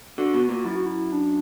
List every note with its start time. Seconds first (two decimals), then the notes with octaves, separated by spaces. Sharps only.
0.18 D3 F#4
0.34 B2
0.49 A#2
0.65 F#2 E4
0.76 F#4
0.86 E4
1.12 D4